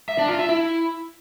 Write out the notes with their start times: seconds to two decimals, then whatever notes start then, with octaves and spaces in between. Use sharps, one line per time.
0.09 E5
0.19 D4
0.29 F4
0.39 E5
0.49 E4